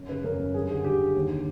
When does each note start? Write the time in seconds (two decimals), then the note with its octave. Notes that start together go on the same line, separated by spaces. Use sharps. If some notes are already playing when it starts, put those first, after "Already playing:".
Already playing: F#2
0.09 C#3 B4
0.24 F#2 A#4
0.39 F#2
0.54 G2 G#4
0.70 D3 G#4
0.84 G2 G4
0.99 D3
1.15 D#2
1.30 D3